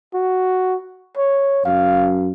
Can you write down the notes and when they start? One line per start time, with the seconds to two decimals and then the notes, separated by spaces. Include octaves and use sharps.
0.14 F#4
1.17 C#5
1.65 F#2 F5